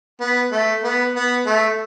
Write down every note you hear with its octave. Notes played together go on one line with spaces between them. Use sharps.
B3
A3
B3
B3
A3